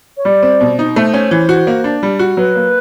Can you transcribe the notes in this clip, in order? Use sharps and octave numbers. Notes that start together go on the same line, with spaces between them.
C#5
G3 D5
C4
B2
D#4
A3 C5
C#4
E3
F#4
A#3
D4
G3
F#4
F#3 B4
A#3